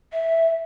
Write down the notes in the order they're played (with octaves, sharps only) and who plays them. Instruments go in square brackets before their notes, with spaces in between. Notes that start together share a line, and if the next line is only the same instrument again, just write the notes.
[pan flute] E5